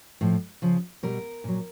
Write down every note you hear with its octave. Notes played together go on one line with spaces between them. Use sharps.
A2 F3
C#3 F3
B2 G3 A#4
A#2 F#3